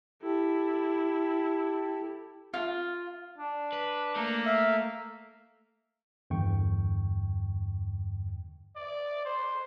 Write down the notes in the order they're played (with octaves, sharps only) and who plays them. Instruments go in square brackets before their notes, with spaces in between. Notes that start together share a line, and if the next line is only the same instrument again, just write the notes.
[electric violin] E4 [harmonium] G4 A4
[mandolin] F4
[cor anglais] D4
[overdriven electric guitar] B4
[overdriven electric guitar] A3 [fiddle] A#3
[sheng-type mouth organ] E5 F5
[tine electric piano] E2 G2 D3 G5 C#6
[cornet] D5
C5